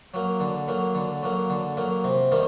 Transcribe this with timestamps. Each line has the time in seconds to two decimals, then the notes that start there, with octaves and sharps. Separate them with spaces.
0.14 F#3 A#3
0.40 D3
0.68 F#3 A#3
0.95 D3
1.23 F#3 A#3
1.50 D3
1.77 F#3 A#3
2.04 C3
2.32 D#3 G3 A#3